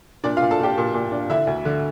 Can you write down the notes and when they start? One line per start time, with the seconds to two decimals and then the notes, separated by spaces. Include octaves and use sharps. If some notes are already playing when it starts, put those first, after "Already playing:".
0.24 A#2 D4 D5
0.37 F4 F5
0.42 A#2
0.51 A4 A5
0.60 A#2 G4 G5
0.78 A#2
0.94 A#2
1.12 D4
1.30 D3 E4 E5
1.47 D2
1.65 D3